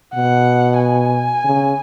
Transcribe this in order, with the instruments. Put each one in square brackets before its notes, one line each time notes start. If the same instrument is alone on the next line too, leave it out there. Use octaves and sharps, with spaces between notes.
[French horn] B2 [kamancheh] F#5
[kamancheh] G#5
[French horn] C#3